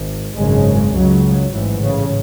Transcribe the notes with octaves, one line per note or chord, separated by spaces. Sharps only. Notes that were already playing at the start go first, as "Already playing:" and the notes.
Already playing: G#1 G#2
G#1 F#2 C#3 G#3
C#2 C#3 F#3
A1 G#2 E3
C#3